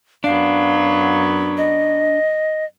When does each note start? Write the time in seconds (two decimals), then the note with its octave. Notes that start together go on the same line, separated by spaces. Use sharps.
0.24 F#2 F#3 B3 D4 F5
1.57 D#5